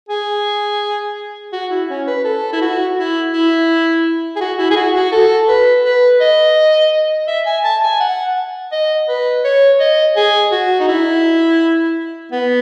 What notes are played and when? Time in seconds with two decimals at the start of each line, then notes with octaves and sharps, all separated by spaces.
0.09 G#4
1.53 F#4
1.70 E4
1.89 C#4
2.07 B4
2.24 A4
2.53 E4
2.61 F#4
2.97 E4
3.33 E4
4.36 G#4
4.40 F#4
4.58 E4
4.70 G#4
4.76 F#4
4.95 F#4
5.12 A4
5.48 B4
5.85 B4
6.20 D#5
7.28 E5
7.46 G#5
7.64 A5
7.83 G#5
8.00 F#5
8.72 D#5
9.08 B4
9.44 C#5
9.80 D#5
10.16 G#4
10.51 F#4
10.80 D#4
10.88 E4
12.32 B3